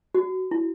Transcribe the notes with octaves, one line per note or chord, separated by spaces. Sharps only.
F#4
E4